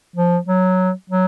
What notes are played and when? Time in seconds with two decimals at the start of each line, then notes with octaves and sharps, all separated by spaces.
0.16 F3
0.47 F#3
1.10 F#3